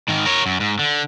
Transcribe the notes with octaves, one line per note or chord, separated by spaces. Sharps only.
G#2 D#3
A#4 C#5
F#2
G#2
D3